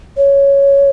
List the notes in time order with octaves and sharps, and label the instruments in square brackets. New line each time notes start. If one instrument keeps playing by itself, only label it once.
[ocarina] C#5